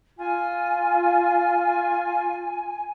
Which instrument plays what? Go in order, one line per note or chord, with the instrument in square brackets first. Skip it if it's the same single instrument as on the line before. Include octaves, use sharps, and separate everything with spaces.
[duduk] F4 [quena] G#5